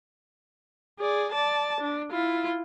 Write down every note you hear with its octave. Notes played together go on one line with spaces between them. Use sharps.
G#4 D5
D5 A5
D4
E4 F4